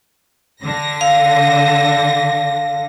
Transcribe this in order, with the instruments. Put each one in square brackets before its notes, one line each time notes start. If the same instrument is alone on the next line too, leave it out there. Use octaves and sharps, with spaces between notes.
[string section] D3 A#6
[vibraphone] F5